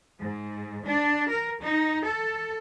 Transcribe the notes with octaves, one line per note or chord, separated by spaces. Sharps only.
G#2
D4
A#4
D#4
A4